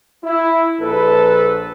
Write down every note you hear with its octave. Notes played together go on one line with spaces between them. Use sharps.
E4
A#1 A4 B4